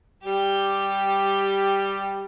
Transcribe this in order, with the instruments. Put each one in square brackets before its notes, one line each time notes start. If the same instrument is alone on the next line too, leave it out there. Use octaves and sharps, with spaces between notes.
[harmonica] G3 [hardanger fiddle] G4